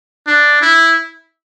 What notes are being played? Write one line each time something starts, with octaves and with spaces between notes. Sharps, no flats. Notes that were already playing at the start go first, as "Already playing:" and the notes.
D4
E4